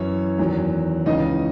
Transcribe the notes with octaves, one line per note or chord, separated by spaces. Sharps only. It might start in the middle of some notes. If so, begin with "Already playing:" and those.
Already playing: F#2 E3 C#4 C#5
E2 D#3 F#3
C#2 C#3 E3 D#4 D#5